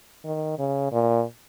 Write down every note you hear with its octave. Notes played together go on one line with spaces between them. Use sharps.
D#3
C#3
A#2